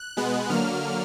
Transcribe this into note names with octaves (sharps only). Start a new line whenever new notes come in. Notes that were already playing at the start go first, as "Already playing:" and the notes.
Already playing: F#6
B2 G#3 B3
D3 F#3 A#3 F6